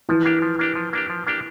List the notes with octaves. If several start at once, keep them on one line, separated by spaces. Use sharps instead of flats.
E3 F3
A#3 D4 G4
F3
A#3 D4 G4
F3
A#3 D4 G4
F3
A#3 D4 G4